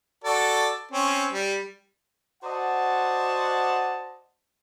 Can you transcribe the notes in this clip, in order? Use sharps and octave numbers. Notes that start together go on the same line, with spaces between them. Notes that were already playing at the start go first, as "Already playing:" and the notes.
F#4 A4 D5
C4 C#4
G3
F#4 C5 D5 D#5 F#5 A5